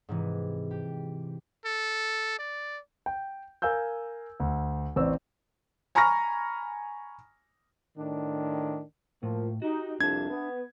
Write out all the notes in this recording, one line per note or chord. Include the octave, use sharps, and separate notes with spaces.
G#2 C3 E3
G4
A4
D5
G5
A#4 F5 G#5 E6 G6
D2
A1 C4 C#5 D5 E6
G#5 A#5 B5 C#6 F6 A#6
A2 D#3 D4
A2 F3 A#3
D#4 F#4 G4
C2 F2 D4 E5 A5 G#6
B3